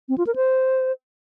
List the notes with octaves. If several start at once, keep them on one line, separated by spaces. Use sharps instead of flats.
C4
F4
A#4
C5